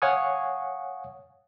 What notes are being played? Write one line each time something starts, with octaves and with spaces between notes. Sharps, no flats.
C#5 F5 F#5 G#5 C#6 D#6